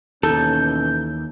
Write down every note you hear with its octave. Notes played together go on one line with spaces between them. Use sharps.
D#2 B2 E3 C#4 A4 G6